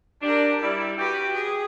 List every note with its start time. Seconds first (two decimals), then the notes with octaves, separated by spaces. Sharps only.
0.22 D4 G4 A#4
0.61 G3 E4 D5
0.97 F#4 G4 B4
1.34 G#4